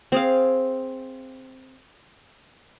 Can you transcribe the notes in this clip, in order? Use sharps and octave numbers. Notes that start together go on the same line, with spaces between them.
C4 G#4 F5